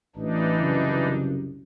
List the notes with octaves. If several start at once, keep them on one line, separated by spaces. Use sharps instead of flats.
A1 E3 D4 D#4
C2 F#2 C#3